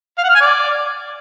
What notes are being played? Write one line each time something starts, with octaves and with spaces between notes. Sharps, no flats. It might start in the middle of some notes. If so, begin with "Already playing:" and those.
F5
F#5
F6
G#5
D5